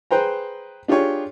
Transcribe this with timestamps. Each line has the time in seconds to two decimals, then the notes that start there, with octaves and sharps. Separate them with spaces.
0.11 G#4 B4 C5 G5 A#5
0.88 D4 F4 G4 G#4 C#5